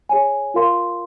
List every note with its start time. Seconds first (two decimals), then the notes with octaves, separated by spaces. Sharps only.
0.09 G#4 C#5 G#5
0.54 F4 A#4 F5 C6